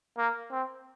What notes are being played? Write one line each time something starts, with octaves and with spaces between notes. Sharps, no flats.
A#3
C4